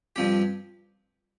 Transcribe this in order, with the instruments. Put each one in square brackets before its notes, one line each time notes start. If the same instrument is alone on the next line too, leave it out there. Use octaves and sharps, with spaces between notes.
[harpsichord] G2 F3 C4 G4